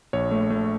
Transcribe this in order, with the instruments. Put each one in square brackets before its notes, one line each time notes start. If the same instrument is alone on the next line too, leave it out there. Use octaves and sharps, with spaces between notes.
[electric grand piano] A#1 C#5
A3
A3